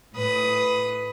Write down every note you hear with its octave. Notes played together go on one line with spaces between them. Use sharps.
A2 B4 D#6